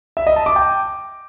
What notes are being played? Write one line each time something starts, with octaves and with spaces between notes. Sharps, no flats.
E5
D#5
A5
D6
G5